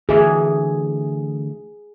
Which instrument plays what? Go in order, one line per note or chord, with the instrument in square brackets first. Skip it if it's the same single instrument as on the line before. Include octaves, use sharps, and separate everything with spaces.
[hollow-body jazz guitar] D2 E3 E5 [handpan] G#4